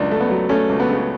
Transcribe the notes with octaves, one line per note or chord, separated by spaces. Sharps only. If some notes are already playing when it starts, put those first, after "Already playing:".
Already playing: C#2 F#2 D4
A3
B3
F#3
A3 C#4
C#2
B3
C#3